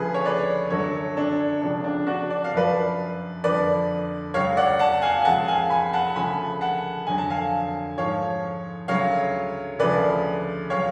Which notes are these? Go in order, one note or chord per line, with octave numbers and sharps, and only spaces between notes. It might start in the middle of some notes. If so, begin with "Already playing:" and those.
Already playing: D2 C#3 F3 G#4 B4
C#5
B4 D5
F#2 D3 F#3 A4 C#5
D4
C#2 C#3 F3 D4
D4
D4 F#4
D5
F5
F#2 F3 B4 D5
F2 D3 F3 B4 D5
C#2 C#3 F#3 C#5 F5
D5 F#5
F#5 A5
F5 G#5
G#5
C#2 C#3 F3 F#5 A5
F5 G#5
G#5 B5
F#5 A5
D2 C#3 F3 G#5 B5
F#5 A5
F2 D3 F#3 G#5
A5
F5 G#5
G#2 F3 C#5 F5
D2 C#3 F#3 C#5 F5
D2 C#3 F3 B4 D5
F#3 C#5 F5